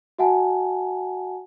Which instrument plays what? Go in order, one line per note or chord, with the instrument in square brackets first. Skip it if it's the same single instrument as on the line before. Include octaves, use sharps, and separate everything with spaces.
[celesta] F#4 E5 F#5 G#5 A5